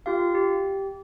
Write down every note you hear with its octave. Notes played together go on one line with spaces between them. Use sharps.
F4 G4 F5
G4